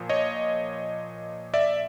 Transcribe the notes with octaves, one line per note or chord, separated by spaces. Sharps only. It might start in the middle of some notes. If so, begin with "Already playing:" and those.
Already playing: A#2 F3
C#5 D#5
D5 E5